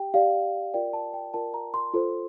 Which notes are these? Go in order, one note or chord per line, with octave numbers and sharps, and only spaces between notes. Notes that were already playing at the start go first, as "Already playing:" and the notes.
Already playing: G4 G5
G4 D5 F5
F4 A#4 D5 G5
A5
G5
F4 A#4 D5 A5
A#5
C6
F4 A4 C5